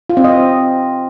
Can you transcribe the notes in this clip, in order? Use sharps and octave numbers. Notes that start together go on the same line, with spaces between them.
F4
C4
D#5